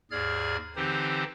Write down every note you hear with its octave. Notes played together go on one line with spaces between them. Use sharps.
D#2 G#2 G#4 D5 F6 G#6
D3 E3 C4 D#4 G4 C5